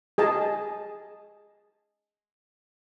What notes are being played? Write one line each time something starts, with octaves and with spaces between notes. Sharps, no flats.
G#4 D#5 A5